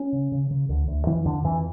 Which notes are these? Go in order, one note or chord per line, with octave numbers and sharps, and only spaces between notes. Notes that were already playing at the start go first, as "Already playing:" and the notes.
Already playing: C#4
C#3
C#3
C#3
D2
D2
F2 E3
F2 D3
F2 E3